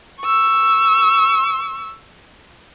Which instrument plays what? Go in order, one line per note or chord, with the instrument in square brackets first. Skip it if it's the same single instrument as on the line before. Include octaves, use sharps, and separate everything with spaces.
[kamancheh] C#6 E6